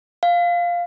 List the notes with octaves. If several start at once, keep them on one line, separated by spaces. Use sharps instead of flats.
F5